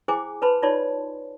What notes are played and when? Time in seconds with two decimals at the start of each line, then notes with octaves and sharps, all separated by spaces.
0.08 E4 G#4 C5 G5 G#5 D6
0.42 B4 C5 A5 B5 C6
0.62 D#4 F4 C#5 D5 A5 C6